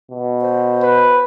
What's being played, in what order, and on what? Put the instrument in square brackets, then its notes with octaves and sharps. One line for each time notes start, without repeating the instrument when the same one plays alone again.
[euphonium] B2
[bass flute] C5
[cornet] B4